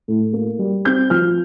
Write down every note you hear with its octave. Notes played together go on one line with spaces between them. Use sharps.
A2
A#3
G3
C4 G6
F3 F6